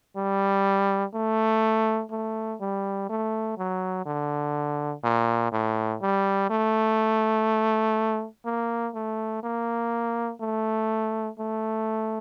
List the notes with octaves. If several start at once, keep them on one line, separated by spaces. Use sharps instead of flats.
G3
A3
A3
G3
A3
F#3
D3
A#2
A2
G3
A3
A#3
A3
A#3
A3
A3